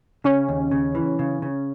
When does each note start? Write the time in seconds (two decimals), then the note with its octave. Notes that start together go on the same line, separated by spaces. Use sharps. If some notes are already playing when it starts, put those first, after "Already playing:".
0.24 C#3 C#4
0.49 D#2
0.71 C#3
0.95 E3
1.19 C#3
1.42 C#3